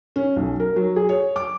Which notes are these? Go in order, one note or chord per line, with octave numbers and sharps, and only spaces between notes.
C#4
B1
A#4
F#3
G#4
C#5
D6